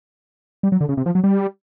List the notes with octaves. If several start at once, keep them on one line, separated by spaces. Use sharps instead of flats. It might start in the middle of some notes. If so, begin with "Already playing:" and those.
G3
F#3
D3
C#3
C3
F3
F#3
G3